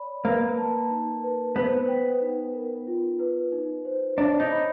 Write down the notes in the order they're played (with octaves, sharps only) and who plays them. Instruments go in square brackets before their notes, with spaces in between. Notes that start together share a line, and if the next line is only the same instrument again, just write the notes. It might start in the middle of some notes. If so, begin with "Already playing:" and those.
Already playing: [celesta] C#5 D5 B5
[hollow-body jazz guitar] A#3 [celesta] B4
[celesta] A5
D#4
B4
[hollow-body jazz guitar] B3 [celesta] C5
[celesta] G5
D#4
A#4
F4
B4
D#4
C5
[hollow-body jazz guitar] D4 [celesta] C#5
[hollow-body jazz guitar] D#4
[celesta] B5